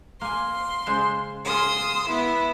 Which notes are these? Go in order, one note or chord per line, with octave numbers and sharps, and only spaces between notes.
A#3 G#5 C6
C#3 G#3 C5
F4 G#4 C6 D#6 E6
B3 E4